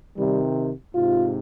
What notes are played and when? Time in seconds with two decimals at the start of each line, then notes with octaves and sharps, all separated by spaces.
0.16 C3 D#3 G3
0.95 G#2 C3 F4